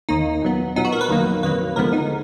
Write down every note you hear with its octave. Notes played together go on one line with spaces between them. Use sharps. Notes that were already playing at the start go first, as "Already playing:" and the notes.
D#2 D#3 A#3 D#4
A#2 F#3 B3
A#2 F#3 B3 D#4
F#4
A#4
B4
F2 D#3 F#3 A#3
F2 D#3 F#3 A#3 B4
D2 D3 F3 G#3 B3 A#4
D#4